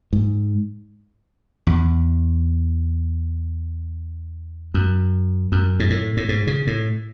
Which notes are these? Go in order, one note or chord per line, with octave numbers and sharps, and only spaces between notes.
G#2
E2
F#2
F#2
G#2
A2
A2
G#2
C#3
A2